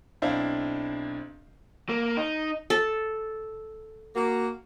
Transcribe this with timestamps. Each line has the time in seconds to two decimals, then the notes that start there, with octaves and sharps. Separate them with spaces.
0.22 B1 C4 D4 E4 F5
1.89 A#3
2.17 D#4
2.70 A4
4.15 A#3 F#4